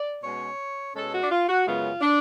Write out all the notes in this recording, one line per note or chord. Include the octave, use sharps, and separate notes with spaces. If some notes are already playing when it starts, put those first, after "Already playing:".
Already playing: D5
B2 G#3 C#4 C#5
B2 G#3 C#4 A4
F#4
D4
F4
F#4
F#2 C#3 G#3 B3 F4
D4